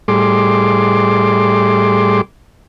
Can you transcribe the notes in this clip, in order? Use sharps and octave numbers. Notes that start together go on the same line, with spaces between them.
A2 G3 G#4 C6 D6